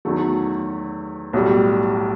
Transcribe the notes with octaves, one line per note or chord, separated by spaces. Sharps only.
E2 D#3 F#3 A3
B1 A2 G3